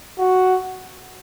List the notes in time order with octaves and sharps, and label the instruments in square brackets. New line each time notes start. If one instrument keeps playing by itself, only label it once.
[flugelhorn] F#4